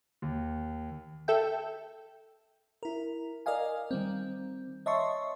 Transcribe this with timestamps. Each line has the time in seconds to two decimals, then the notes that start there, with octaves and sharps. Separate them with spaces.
0.22 D#2
1.28 A4 E5 G5
2.83 E4 A#4
3.46 A#4 D5 D#5 F5 G#5
3.91 D#3 G3 C4
4.86 C#5 D#5 E5 A5 C6 C#6